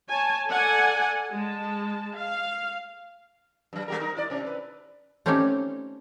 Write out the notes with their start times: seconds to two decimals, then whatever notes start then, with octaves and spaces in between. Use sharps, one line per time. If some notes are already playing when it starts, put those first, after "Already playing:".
0.10 C#5 G#5 A5
0.48 A4 D5 F#5 G#5
1.30 G#3 A5
2.15 F5
3.73 G2 F#3
3.88 G3 G4 A#4
4.00 D#4 A#4
4.17 E4 D5
4.30 C3 C#4
4.46 B4
5.26 A3 C4 C#4 D#4 G4 D5